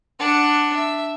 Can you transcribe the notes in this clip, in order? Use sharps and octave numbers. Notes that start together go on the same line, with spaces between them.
D4 F#5
E5